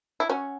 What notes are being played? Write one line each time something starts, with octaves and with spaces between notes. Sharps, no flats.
E4
C#4 F#4